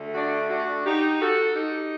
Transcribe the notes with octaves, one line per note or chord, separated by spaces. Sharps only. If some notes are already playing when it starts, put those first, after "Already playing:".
Already playing: D2 D3 A3
D4 F#4
D4 F#4
D#4 G4
F#4 A4
D#4 G4